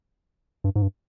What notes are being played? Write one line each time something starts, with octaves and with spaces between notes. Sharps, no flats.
G2
G#2
G2